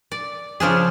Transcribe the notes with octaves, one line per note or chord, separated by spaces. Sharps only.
D5
C#3 F3 D4 G#4